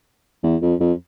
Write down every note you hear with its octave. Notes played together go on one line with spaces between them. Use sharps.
E2
F2
F2